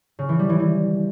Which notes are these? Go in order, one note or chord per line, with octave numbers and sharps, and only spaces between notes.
C#3
E3
G3
E3
E3